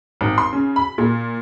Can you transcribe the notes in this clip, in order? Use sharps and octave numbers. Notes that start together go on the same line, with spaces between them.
G#1
C6
C#3
B5
A#2